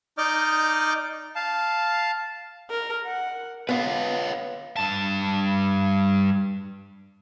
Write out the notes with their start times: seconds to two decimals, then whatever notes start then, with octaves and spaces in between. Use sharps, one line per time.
0.18 D#4 D5 D#5 D6 F6 G6
1.36 F5 A5
2.71 A#4
3.06 F#5
3.69 B3 B4 C#5 F5
4.76 G2 A5